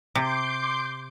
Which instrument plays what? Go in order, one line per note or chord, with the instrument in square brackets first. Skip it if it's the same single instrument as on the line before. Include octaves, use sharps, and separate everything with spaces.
[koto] C3 [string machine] C6 D6 G6